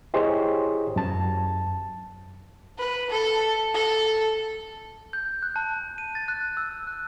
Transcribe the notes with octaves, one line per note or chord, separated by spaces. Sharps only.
E4 G4 G#4 C5 C#5 D#5
F#2 A5
B4
A4
A4
G6
F#6
A5
D#7
A6
F#6
E6
F#6